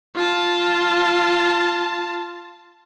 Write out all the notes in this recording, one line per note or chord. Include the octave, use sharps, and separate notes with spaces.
F4 A5